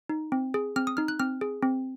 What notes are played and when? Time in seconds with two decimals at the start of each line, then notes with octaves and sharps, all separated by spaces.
0.09 D#4
0.32 C4
0.54 G#4
0.76 C4 F6
0.87 D#6
0.97 D#4 F6
1.08 F#6
1.19 C4 F6
1.41 G#4
1.63 C4